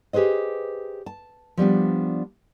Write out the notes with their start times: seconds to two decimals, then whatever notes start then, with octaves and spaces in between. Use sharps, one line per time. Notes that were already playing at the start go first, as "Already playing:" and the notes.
0.13 G4 G#4 B4 C5 D#5
1.06 A5
1.57 F3 G3 B3 D4